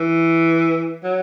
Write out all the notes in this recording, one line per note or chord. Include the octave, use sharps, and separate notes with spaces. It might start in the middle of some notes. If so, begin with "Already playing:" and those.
Already playing: E3
F#3